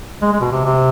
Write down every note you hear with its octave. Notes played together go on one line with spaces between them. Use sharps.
G#3
G#3
B2
C3
C3